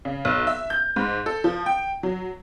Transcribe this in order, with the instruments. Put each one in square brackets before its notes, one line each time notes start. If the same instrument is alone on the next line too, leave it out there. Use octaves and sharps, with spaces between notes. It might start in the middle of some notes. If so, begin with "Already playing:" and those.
[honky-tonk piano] C#3
B1
E5
G6
G#2
A4
F3
G5
F#3